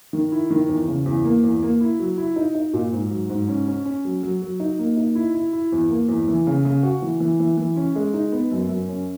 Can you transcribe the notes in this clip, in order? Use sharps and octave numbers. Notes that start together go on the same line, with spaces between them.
D#3
E4
D#3
E2
C#3
E2
A#3
E2
A#3
E4
F#3
E4
D#4
D#4
A#2
G#2
F#3
G#2
C#4
C#4
C#4
F#3
F#3
F#3
D#4
A#3
D#4
E4
E4
E4
E2
A#3
E2
E3
C#3
C#3
F#4
E3
E3
E3
E3
C#4
G#3
D#4
B3
F#2
F#2
C#4